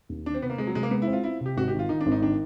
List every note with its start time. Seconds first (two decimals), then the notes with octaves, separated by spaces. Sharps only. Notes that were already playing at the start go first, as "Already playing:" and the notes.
0.09 D#2
0.26 D#3 D4
0.34 C4
0.42 C3 B3
0.50 A#3
0.58 G#3 C4
0.67 F#3
0.75 C3 G#3
0.83 A#3
0.91 G#3 B3
1.02 E4
1.07 C4
1.13 F4
1.24 C4 E4
1.41 C3
1.46 G4
1.57 G#1 F#4
1.68 G4
1.73 D#3
1.79 F4
1.89 D#3 D#4
2.01 D4
2.06 G#1
2.12 D#4
2.22 D#3 D4